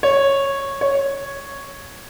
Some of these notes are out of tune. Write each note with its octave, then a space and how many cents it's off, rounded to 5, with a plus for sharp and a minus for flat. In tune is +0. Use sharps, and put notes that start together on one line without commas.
C#5 -10
C#5 -5